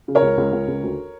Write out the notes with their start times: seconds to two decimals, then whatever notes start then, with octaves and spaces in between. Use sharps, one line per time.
0.08 C#3
0.15 A#4 C#5
0.22 C#2
0.38 C#2
0.53 C#2
0.68 C#2
0.83 D2